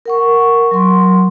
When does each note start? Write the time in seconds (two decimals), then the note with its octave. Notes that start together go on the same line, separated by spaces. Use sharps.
0.06 A#4 F#5 C#6
0.71 F#3 C6